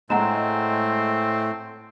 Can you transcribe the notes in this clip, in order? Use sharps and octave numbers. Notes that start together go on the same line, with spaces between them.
A2 G#3 A3 C4 F#5 A#5 E7